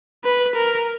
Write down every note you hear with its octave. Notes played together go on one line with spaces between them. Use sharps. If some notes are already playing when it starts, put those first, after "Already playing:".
B4
A#4